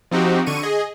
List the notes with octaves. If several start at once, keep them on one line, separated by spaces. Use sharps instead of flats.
F3 C4 D#4 F#4 G4
D3 C#6 D#7
G#4 D#5